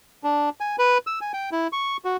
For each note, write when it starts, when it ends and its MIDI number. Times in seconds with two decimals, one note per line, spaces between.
0.24 0.49 62
0.60 0.76 80
0.79 0.98 71
1.07 1.19 88
1.21 1.32 80
1.33 1.50 79
1.52 1.67 64
1.73 1.97 85
2.05 2.17 66